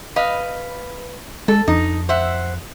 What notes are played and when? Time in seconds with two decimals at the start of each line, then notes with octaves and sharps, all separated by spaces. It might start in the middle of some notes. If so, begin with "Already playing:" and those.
0.16 B4 D#5 F5
1.48 G#3 A4
1.68 F2 D#4
2.09 C5 E5 F#5